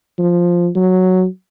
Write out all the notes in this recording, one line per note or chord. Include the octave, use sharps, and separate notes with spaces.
F3
F#3